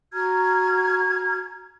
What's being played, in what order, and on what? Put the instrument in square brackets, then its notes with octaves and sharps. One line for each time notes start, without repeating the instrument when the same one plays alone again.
[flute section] F#4 A#5 F6 G#6